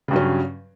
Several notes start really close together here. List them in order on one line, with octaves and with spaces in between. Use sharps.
C#3 G2 F#3 C#4